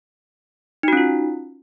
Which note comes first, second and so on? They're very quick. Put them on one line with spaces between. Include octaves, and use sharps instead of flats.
D#4 F#4 C#4 F4